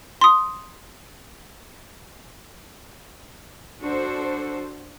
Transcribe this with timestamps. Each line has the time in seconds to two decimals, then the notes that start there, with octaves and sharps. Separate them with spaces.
0.21 C6 D#6
3.82 D4 F#4 A4 C5